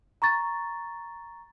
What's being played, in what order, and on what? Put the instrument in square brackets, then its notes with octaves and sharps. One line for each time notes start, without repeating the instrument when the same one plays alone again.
[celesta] A#5 C#6 A6